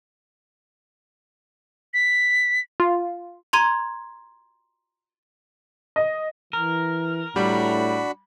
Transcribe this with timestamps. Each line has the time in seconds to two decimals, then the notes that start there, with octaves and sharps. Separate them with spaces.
1.94 B6
2.80 F4
3.53 A#5 C6 G#6 D#7
5.96 D#5
6.53 E3 A#4
7.36 A2 G3 D4 F#4 B5